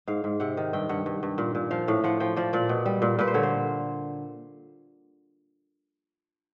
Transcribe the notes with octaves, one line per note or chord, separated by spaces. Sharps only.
G#2 F5
G#2
C3 F#5
D#3
G2 G5
G2 F#5
G2
G2
A#2
A#2
F3 F5
A2 F5
F3 F#5
F3 G5
F3 D5
A#2 D5
B2
G3
A#2
A#2 B4
C5
D3 C#5
C5